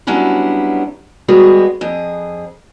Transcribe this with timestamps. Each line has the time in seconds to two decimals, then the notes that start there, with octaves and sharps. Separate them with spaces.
0.07 F#3 G3 B3 C#4 D4 E4
1.28 G3 G#3 B3 F#4 G#4
1.81 F2 G#4